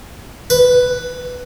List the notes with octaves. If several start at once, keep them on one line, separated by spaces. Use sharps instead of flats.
B4